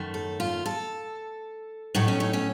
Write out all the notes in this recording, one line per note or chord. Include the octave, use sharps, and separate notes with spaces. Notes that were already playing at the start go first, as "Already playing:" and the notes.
Already playing: F#2 D#3 A3
A4
F4
A4
A2 F#3 A3 D#4
C#4
D#4
C#4